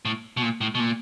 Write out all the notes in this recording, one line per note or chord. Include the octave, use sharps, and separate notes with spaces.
A2
B2
A#2
A2
B2
A#2